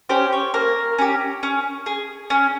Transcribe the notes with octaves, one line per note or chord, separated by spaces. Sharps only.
C#4 G4 C5
C#5
A#3 A#4
C#4 G4
C#4
G#4
C#4